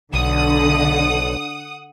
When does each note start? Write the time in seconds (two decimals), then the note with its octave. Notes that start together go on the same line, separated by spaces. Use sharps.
0.14 B1 D3 F#5 D#6